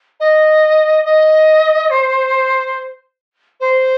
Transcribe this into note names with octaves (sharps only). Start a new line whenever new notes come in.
D#5
D#5
C5
C5